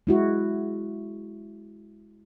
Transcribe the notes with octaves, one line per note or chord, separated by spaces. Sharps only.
G#3 E4 F#4